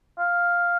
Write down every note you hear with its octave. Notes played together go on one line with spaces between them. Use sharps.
F5